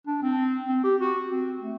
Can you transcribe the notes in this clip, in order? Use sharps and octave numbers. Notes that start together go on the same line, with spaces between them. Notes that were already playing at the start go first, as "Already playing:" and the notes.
D4
C4
C4
G4
F#4
C4
A3